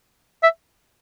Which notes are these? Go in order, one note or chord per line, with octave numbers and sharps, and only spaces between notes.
E5